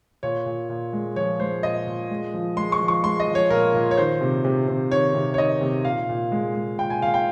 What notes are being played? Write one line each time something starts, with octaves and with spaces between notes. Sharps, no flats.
A#2 C#5
A#2
A#2
G#3
F3 C#5
G#3 C5
A#2 D#5
A#2
G#3
F3
G#3 C6
C#6
F3
C#6
G#3 C6
D#5
F3
C#5
A#2 A#4
A#2
C#5
D#3 C5
C3
C3
C3
D#3 C#5
C3
C#5
D#3 D#5
C3
A#2 F5
A#2
G#3
G#3
A#2 G5
G#5
A#2 F5
G5